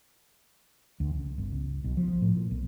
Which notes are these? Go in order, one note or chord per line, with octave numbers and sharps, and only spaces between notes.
D2
C#2
G1
C#2
B1
F3
A2
A#2
B1